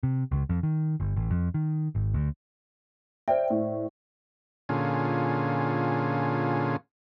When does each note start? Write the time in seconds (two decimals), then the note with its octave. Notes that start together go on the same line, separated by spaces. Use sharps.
0.03 C3
0.31 C#2
0.49 F2
0.63 D#3
1.00 G1
1.16 A1
1.31 F2
1.54 D#3
1.95 G#1
2.14 D2
3.28 C5 D5 E5 G5
3.50 A2
4.69 A#2 D3 C#4 F4 G#4